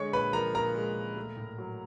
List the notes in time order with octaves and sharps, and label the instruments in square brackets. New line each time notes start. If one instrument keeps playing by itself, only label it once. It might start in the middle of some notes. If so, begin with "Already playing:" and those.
Already playing: [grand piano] D3 G#3 C#5 C#6
A#2 B4 B5
F3 A#4 A#5
A#2 A#4 A#5
G#3
A#2
A3
A2
F#3